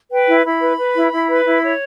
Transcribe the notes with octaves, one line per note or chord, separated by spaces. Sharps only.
B4 G5
E4
E4 B5
B4
B4
E4
E4
B4
E4
C#5